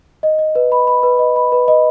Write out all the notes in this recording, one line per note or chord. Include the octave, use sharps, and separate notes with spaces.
D#5
D#5
B4
B5
B5
B4
D#5
B5
B4
D#5